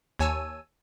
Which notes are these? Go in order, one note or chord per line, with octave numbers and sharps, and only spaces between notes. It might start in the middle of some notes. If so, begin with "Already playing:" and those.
D#2 C#5 G#5 A5 E6 D#7